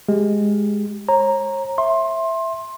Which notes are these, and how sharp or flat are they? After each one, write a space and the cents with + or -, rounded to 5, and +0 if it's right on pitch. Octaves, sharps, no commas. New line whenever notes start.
G#3 +0 G4 +0
C#5 -40 A#5 +0
E5 +0 C6 +20